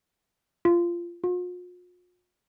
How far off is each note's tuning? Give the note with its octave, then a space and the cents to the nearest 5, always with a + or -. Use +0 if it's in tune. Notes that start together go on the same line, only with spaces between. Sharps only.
F4 -15
F4 +45